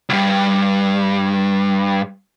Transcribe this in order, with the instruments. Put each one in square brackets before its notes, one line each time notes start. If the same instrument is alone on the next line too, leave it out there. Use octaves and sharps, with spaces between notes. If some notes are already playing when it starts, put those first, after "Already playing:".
[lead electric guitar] C#2 G2